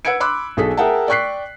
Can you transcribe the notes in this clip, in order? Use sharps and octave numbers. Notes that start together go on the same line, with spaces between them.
B4 F#5 E6 G#6 C#7 D7
B5 C6 D6 E6 F#6
B1 G#4 A4 B6
G#4 A#4 E5 F#5 G5 A5
D5 G5 C#6 F#6 B6 C7